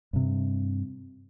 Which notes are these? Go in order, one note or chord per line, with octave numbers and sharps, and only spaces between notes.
G2 C3